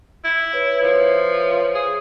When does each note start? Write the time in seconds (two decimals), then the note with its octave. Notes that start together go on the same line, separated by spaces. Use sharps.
0.25 E4
0.53 B4 C#5 E5
0.83 F3
1.75 G#4